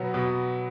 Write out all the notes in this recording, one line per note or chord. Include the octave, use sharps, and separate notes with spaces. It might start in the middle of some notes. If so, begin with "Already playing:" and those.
Already playing: B2 F#3 B3
B2